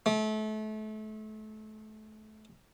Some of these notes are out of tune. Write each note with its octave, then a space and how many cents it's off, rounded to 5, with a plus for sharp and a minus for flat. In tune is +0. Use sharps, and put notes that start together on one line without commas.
A3 -30